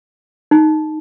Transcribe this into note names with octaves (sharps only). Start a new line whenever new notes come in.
D#4